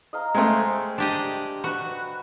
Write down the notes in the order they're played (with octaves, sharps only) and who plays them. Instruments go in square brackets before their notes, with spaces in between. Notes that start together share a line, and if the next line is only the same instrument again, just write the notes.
[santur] D#5 F5 A#5
[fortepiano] G#3 A3 [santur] C5 G5 C6
[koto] D4 G4 D#5
[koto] F#4 [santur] B4